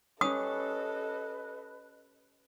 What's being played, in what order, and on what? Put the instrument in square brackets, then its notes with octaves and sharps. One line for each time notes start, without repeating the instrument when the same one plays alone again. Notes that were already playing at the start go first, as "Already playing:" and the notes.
[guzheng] C#4 G4 [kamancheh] A4 D#5 [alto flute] B4 [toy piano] D#6